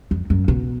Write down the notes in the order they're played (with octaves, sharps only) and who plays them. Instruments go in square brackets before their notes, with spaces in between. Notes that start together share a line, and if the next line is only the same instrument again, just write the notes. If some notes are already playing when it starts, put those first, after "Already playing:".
[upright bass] F2
F#2
B2